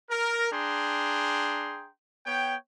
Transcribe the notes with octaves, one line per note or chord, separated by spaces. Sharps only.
A#4
D4 G#4 G5 A#5 C6
B3 C#5 G5